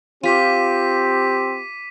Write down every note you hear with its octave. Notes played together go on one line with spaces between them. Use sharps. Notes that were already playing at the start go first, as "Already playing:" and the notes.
C4 F4 G4 D6 B6 D#7